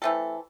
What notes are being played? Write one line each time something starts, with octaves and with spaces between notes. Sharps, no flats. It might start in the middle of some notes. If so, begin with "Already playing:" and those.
E3 A3 C4 A4